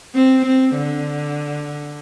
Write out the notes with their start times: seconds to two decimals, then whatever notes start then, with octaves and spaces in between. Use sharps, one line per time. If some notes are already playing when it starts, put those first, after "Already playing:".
0.15 C4
0.46 C4
0.76 D3